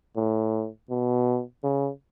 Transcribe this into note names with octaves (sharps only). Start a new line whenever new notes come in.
A2
B2
C#3